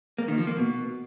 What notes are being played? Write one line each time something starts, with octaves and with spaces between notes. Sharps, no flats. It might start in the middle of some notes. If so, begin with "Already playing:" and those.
A#3
D#3
F3
A#3
B2